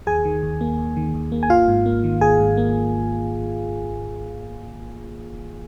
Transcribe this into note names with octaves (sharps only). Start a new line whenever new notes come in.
D#2 G#4 G#5
D#3
D#2
A#3
D#2
D#3
D#2
A#3
G#5
G#1 F4 F5
G#2
A#3
D#3
G#1 G#4 G#5
G#2
A#3